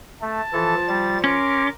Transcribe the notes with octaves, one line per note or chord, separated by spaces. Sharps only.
A3 A5
E3 F3 A4
G3 A6
C#4 A#4 C6 D6